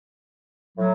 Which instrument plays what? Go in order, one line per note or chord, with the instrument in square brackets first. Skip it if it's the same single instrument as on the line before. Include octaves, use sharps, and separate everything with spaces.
[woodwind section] A2 F#3